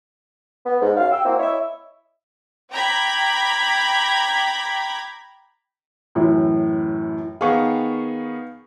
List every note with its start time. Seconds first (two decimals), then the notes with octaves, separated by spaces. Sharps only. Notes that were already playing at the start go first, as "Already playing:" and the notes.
0.66 B3
0.82 G#2
0.97 F#2 F#3 F5
1.12 G5 E6
1.25 A#3 C4 E4 F#4
1.40 E4 C#5 D#5 E5
2.71 G5 A#5 B5 D6 G#6 B6
6.15 F#2 A2 E3
7.41 D#3 B3 G#4 F5 C#6